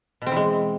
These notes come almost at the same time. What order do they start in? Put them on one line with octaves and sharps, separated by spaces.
B2 C4 E3 G#3